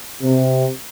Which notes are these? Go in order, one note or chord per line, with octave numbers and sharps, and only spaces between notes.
C3